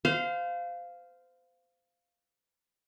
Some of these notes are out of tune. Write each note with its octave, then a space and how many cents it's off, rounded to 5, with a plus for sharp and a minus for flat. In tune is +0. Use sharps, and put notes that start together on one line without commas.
C5 -30 F5 +0